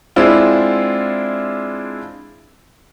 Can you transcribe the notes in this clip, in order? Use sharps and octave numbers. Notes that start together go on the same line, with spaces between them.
G#3 C4 D4 E4 F4